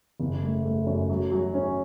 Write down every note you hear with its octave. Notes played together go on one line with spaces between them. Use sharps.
F#1
A3
A3
F#2
F#3
F#3
C#4